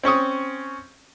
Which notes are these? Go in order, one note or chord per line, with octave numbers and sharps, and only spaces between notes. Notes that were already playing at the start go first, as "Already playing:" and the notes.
C4 C#4 C#6 D#6